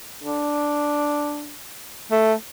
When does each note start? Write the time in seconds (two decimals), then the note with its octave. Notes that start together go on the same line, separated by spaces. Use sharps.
0.24 D4
2.11 A3